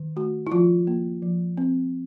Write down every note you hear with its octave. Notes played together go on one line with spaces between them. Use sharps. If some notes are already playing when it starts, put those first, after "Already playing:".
Already playing: D#3
A3 F#4
E4
F3 F4
A#3
F3
C4